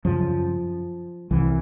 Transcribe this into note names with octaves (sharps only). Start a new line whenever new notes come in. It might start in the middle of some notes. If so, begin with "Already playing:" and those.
F#2 C#3 F3
C2 C3 E3